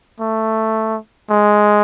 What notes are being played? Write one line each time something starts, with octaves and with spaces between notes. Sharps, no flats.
A3
G#3